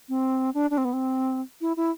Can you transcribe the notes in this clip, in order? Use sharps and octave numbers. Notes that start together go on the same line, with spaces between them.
C4
D4
D4
C4
B3
C4
E4
E4